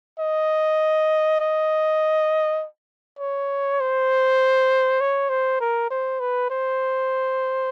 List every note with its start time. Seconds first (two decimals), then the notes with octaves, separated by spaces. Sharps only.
0.19 D#5
1.40 D#5
3.19 C#5
3.80 C5
5.01 C#5
5.29 C5
5.61 A#4
5.91 C5
6.20 B4
6.50 C5